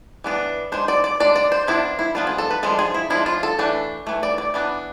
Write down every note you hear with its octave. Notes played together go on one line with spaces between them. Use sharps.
E3 B3 D4
G#3 D4 C5
D5
D5
G#3 D4 D5
D5
C5
F3 B3 D4 E4
E4
F3 B3 D4 F4
G#4
A4
B4
F3 G#3 D4 A4
G#4
E4
F3 G#3 D4 E4
F4
A4
E3 A3 D4
E3 A3
D5
D5
E3 B3 D4